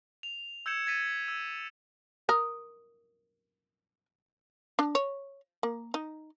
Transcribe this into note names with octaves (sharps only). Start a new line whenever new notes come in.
F7
E6 G6 G#6 C#7 E7
G#6 A6 B6 D#7
E6
A#4 D#6
D4
C#5
A#3
D#4